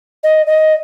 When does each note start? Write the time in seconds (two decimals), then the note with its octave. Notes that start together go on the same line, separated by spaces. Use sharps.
0.24 D#5
0.47 D#5